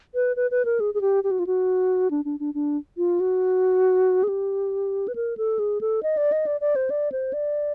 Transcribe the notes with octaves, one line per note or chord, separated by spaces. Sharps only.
B4
B4
B4
A#4
G#4
G#4
G4
G4
F#4
F4
F#4
D4
D4
D4
D4
F4
F#4
G#4
G4
B4
A#4
A4
G#4
A4
D#5
D5
D#5
D5
D5
C5
D5
C5
D5